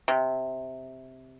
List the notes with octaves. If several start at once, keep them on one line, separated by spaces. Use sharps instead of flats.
C3